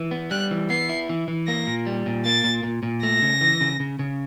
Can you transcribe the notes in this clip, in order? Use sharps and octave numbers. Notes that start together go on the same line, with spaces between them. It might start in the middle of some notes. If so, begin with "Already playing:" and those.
Already playing: E3
B3
G3 F#6
E3
B3 C7
E4
E3
E3
A#3 A#6
A#2
G3
A#2
A#3 A6
A#2
A#2
A#2
A3 A#6
C#3
E3
C#3
C#3
C#3